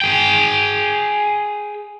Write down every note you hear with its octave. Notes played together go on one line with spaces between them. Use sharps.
G#4 G5